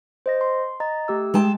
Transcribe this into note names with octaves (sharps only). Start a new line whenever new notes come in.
C5 D#5 A#6
C6
D#5 A#5 A6
A3 G4 E6
G#3 G5 A5